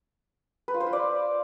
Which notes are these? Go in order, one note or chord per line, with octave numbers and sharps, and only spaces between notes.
B4
F4
C5
F4
D5